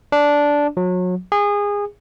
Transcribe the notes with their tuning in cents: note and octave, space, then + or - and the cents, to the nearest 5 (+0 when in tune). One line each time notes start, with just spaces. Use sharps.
D4 -10
F#3 -30
G#4 -25